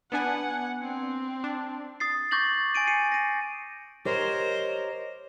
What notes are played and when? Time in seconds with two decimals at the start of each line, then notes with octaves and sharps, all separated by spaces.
0.12 B3 D4 F#5 G#5
0.82 C4
1.44 D4
2.00 D#6 A6 C7
2.31 C#6 D6 G6 A6 A#6 F#7
2.75 G#5 A6 D7 D#7
2.87 C7 C#7 D#7
3.12 A#6 D#7
4.05 G4 A#4 C5 C#5 D#5